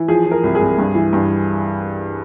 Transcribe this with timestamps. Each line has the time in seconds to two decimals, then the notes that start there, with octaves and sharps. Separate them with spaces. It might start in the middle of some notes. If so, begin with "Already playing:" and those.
Already playing: E3
0.08 F3 G#4
0.26 F3
0.31 A#4
0.43 C2
0.55 G#4
0.61 C2
0.78 G2
0.95 E3
1.13 G2